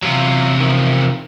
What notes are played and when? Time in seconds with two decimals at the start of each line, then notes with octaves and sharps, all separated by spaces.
0.03 E2 C3 F#3 F4
0.60 D#3 F3